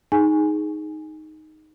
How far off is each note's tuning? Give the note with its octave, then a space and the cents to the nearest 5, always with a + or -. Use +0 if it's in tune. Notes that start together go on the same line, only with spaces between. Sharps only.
D#4 +0 G#4 +10 G#5 +0